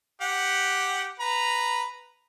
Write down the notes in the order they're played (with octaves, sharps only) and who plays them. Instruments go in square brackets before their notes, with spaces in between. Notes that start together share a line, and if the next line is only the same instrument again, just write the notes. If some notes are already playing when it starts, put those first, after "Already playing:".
[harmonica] G4 F#5
B4 A#5